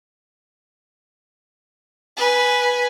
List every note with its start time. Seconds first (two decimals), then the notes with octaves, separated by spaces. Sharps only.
2.17 B4 G#5